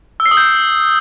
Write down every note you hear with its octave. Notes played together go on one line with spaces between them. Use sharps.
E6
C7
D#6
G6